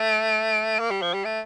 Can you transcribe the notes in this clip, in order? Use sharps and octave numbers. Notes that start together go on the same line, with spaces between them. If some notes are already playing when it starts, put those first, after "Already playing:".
Already playing: A3
A#3
G3
F3
G3
A3